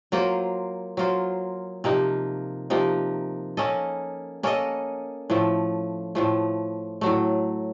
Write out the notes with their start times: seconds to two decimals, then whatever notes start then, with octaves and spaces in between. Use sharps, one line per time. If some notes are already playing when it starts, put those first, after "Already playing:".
0.12 F#3 A#3 F4 C5
0.97 F#3 A#3 F4 C5
1.84 C3 F3 A#3 D#4
2.70 C3 F3 A#3 D#4
3.57 A#3 C#4 A4 D#5
4.43 A#3 C#4 A4 D#5
5.30 A2 F3 A3
6.15 A2 F3 A3
7.01 A2 F#3 A3